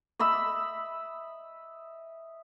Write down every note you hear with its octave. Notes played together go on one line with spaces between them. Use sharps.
D#5 E5 B5 E6